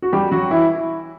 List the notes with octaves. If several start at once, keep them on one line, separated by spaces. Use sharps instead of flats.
F#4
G3 G4
F#3 F#4
E3 E4